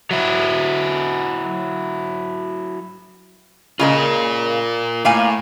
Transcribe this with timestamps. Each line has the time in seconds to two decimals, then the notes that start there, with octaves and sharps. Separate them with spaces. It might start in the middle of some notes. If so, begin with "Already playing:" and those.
0.11 F#3 E4
3.79 C#3 G#3 A#3 F4 A#4
5.05 A2 A#3 F5 G#5